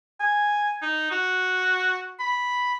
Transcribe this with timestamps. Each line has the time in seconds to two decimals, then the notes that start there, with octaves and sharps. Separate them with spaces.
0.20 G#5
0.82 D#4
1.11 F#4
2.19 B5